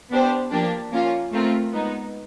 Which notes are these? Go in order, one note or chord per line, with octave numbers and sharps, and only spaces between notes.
B3 D4 G4 C5
F3 A#3 D4 G4
A#3 C#4 F4
A3 C4 F4 A#4
G#3 B3 D#4